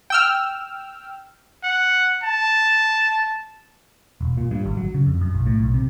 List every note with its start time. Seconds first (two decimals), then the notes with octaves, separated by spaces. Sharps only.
0.10 G5 E6 F6
1.64 F#5
2.24 A5
4.21 E1
4.37 A#2
4.51 G2
4.65 G#1
4.77 F#3
4.94 C#3
5.06 F2
5.21 F#2
5.34 B1
5.46 A2
5.59 B1
5.74 C3